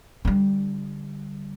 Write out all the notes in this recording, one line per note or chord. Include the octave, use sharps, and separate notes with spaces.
D3 G3